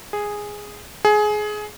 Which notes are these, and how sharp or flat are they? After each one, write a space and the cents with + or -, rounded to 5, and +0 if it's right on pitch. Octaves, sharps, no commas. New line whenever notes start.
G#4 -5
G#4 +20